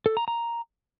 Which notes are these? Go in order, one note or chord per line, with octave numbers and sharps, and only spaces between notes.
A4
A#5
A#5